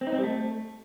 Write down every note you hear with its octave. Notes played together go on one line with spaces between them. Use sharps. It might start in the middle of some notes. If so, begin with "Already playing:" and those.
C4
D#4
C4
G3
A3